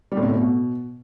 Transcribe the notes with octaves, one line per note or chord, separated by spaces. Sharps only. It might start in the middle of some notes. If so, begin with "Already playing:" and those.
G3
A2
C3
A2
B2